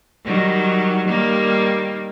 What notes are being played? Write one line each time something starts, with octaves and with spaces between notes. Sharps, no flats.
D#3 F#3 G3
D#3 G3 A#3